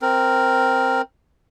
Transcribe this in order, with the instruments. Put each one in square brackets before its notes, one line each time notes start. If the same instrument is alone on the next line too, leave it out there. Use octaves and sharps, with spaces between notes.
[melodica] C4 A#4